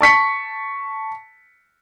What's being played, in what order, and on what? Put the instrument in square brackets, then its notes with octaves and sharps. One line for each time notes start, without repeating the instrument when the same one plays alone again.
[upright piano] A5 C#6 B6 C#7